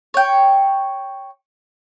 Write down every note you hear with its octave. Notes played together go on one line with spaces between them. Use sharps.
C#5 G5